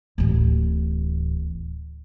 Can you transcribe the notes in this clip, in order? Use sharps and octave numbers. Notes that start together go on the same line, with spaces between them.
D1 A1